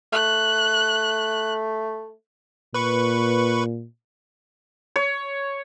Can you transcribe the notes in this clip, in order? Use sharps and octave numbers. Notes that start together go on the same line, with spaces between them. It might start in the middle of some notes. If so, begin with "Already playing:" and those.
A3 F#6
A#2 B4 C#6
C#5